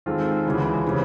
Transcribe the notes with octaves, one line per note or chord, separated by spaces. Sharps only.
D#3 G#3 C4 F4 A4
D2 C#3 E3 G#3
C#3 E3 G3 C4